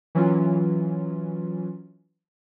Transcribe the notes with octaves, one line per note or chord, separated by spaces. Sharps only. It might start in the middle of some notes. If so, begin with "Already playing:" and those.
E3 F#3 C#4 F4